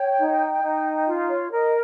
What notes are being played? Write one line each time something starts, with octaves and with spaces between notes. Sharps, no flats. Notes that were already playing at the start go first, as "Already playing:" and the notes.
Already playing: C#5 G5
D#4
D#4
F4
C#5
A#4 D#5